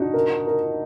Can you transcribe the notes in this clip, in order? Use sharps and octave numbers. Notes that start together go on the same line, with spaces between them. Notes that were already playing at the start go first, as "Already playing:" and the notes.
Already playing: D4 D#4 F#4
A#4
A#4